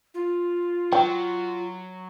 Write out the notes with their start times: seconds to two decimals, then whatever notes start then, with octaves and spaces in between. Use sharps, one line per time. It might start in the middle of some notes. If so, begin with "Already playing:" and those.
0.14 F4
0.92 F#3 G5